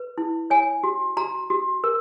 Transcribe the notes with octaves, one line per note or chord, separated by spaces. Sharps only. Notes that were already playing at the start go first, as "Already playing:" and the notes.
Already playing: B4
E4
C#5 G#5
F#4
F#4 A#5
F#4
A#4